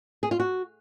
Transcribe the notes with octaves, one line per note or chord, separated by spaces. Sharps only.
G#4
F4
F#4